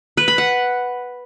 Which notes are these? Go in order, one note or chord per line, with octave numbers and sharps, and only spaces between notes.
B4
B5
F#5